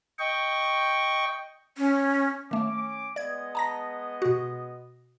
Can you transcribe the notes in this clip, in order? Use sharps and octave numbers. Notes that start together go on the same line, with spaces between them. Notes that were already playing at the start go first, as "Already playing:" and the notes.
D#5 G5 C#6
C#4
D#3 A3 C#4 D6
G#3 B3 D5 D#5 G#6
A5 A#5 A#6
B2 F#4